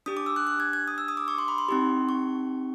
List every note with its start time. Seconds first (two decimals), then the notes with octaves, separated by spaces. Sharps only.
0.06 D4 G4 D#6
0.17 D6
0.26 E6
0.36 F#6
0.47 F#6
0.60 G#6
0.73 G#6
0.88 D#6
0.98 E6
1.08 D#6
1.17 D6
1.28 C#6
1.38 C6
1.48 B5
1.58 C6
1.69 C4 D#4 G4
2.09 C#6